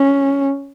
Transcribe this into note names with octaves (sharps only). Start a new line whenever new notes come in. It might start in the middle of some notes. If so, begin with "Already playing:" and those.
Already playing: C#4